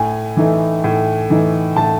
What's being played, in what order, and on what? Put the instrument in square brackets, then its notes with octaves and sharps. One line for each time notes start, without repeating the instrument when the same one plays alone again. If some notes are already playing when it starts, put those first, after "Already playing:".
Already playing: [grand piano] A2 G#5
E3 A3 D#4
A2
E3 A3 D#4
A2 A5